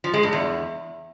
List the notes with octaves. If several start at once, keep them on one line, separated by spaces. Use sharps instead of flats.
F3
G#3
G2
E2